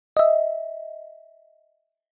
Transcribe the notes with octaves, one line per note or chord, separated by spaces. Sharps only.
D#5 E5